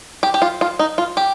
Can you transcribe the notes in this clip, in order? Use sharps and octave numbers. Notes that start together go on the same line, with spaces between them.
G4
G4
F4
F4
D#4
F4
G4